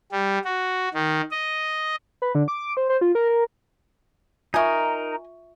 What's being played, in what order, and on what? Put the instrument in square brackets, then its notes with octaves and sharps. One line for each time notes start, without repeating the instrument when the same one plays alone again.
[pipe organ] G3
F#4
D#3
D#5
[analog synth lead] B4
D3
D6
C5
C5
F4
A#4
A#4
[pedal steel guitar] D#4 A#4 [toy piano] F4 E5 C#6 [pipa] D#5 G#5